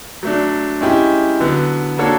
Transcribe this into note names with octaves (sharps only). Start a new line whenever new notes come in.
F#3 A3 D4
G#3 C#4 E4 G4
D3 F#3 B3
A#3 D4 F#4 A4 C#5